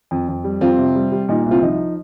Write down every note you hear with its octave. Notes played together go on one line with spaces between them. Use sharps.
F2
F2
G3
F2 C4 F4
C3
G3
G3
A#2 D#4
C2
C4 F4
F3 D#4